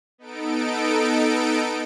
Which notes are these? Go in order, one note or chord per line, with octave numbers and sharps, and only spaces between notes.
B3 D#4 A4 D7